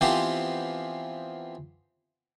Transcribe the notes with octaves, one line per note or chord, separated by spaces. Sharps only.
E3 F3 B3 C4 G4 C5